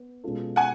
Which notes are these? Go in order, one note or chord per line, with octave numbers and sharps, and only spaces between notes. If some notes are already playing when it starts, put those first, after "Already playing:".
Already playing: B3
B2 G#3 C#4 F4 A4
F#5 G#5